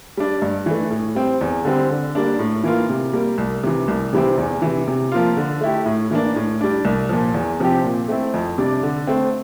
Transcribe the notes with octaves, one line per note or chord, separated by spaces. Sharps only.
G3 D4
G2
E3 A3
A2
G3 C4
E2
D3 G3 C4
D3
G3 A#3 D4
A2
E3 A#3 F4
C3
G3 A#3
C2
C3 E3
C2
C3 E3 G3 C4
E2
C3 E3
C3
F3 A#3 F4
D3
A3 E4 G4
A2
E3 A#3 D4
A2
G3 D4
C2
A#2 F3
E2
C3 F3 C4 G4
A#2
A3 C4 E4
F2
C3 G3 D4
D3
A3 C4